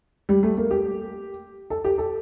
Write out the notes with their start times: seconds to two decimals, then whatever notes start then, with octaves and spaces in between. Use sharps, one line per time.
0.29 G3
0.43 A3
0.57 A#3
0.71 G4
1.70 A4
1.84 G4
1.98 A4